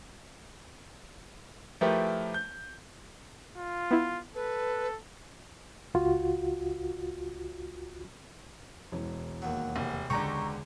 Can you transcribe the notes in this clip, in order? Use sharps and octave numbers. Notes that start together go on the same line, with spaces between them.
F3 A3 E4 G4 A#4 B4
G6
F4
B3 E4
A4 B4
C#2 F4 F#4
E1
D#2 F#3
F1
C#2 D3 G4 A#5 C#6